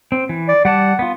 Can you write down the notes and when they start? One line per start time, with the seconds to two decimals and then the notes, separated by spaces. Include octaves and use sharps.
0.12 C4
0.29 E3
0.48 D5
0.65 G3 D5 F#5 A5
0.99 B3 F4